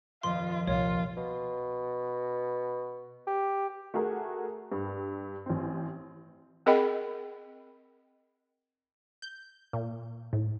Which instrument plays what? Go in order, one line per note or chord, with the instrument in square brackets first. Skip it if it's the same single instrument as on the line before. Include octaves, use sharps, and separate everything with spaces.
[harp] D#1 F2 F3 [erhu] F4 [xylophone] C6
[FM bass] C2 [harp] A#2 [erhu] F4 [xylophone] C#5
[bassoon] B2
G4
[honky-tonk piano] A3 F#4 G#4 A#4
G2
A1 C4
[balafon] C4 G#4 A#4 D#5 G5 B5
[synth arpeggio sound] G6
A#2
A2